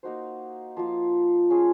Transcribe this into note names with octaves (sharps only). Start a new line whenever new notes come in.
A#3 D#4 F#4 C5
F3 A#3 F4
C#4 F4 G#4